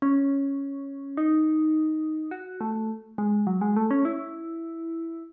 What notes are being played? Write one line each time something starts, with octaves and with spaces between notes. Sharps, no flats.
C#4
D#4
F#4
A3
G#3
F#3
G#3
A3
C#4
E4